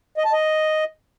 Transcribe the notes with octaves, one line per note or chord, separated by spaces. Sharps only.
D#5
A5
D#5